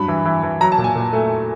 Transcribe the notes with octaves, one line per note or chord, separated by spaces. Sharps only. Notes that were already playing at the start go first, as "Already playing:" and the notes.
Already playing: G2 F#3 B5
E3
E3
E3
F#3 A#5
A5
A#2
G#5
A#2
A3